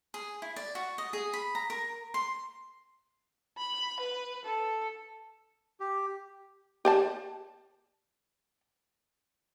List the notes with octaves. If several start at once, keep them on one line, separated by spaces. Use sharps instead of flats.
G#4
E4
D5
F#4
D#5
G#4
B5
A#5
A#4
C6
B5
B4
A4
G4
G4 D5 A5